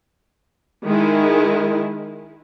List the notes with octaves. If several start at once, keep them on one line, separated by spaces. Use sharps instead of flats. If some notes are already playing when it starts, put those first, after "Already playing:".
D#3 G#3 E4